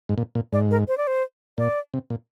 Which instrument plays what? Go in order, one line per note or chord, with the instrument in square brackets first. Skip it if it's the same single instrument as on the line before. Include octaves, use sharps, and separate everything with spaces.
[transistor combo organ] G#2
A#2
A#2
[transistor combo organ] G#2 [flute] D5
[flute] A#4
C5
D5
C5
[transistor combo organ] A#2 [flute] D5
[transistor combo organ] C3
A#2